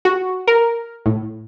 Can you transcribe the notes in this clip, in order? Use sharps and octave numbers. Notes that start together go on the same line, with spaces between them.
F#4
A#4
A2